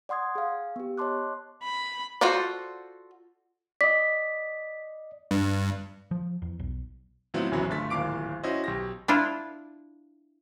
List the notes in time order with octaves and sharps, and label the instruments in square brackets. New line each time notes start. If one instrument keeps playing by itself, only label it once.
[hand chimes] D5 F#5 C6 D#6 G#6
G#4 F5
B3 G4
C#5 D#5 A5 C6 D6 F#6
[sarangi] B5
[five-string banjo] F4 F#4 A4 C5 D5
[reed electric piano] D5 D#5 [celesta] B6
[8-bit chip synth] G2
[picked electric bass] F3
E2
B1
[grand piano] A2 F3 F#3 B3 C4 E4
D1 A#1 F#2 E3 F#3 B5
G1 D3 A3 A6 B6
D1 G#1 A#2 F5 D6 D7
C#4 E4 F#4 C5 D#5
B1 G4 A#6
[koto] D4 E4 F4